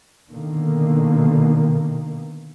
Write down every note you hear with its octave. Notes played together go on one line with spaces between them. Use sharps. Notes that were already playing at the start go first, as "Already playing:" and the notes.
B2 D3 D#3 A#3